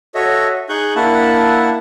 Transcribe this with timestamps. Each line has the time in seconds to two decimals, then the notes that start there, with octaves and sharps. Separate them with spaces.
0.15 F#4 A4 C#5 D#5 E5
0.69 D#4 G#4 C#6 F#6 G6
0.96 A#3 D4 E4 E5 F#5 A5